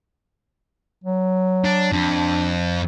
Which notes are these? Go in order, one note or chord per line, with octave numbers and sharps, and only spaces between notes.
F#3
D4
F2 D4